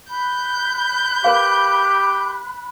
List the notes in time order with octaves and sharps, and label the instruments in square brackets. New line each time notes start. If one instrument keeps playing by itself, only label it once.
[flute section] B5 F#6 [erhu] G6
[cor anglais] G4 [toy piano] A#4 B4 F5